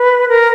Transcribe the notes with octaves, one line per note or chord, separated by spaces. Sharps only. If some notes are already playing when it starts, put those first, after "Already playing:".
Already playing: B4
A#4